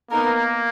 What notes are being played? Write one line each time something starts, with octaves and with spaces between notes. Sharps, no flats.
A#3 B3 D#4 A#4